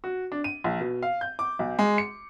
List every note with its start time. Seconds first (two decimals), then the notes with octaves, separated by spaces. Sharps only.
0.04 F#4
0.32 D4
0.44 D#7
0.64 A#1
0.81 B2
1.03 F5
1.21 G6
1.39 D6
1.59 B1
1.79 G#3
1.98 C#7